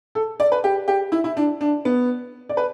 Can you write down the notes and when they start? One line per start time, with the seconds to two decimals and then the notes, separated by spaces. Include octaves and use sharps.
0.15 A4
0.40 D5
0.52 B4
0.64 G4
0.88 G4
1.12 E4
1.24 E4
1.37 D4
1.61 D4
1.85 B3
2.49 D5
2.57 B4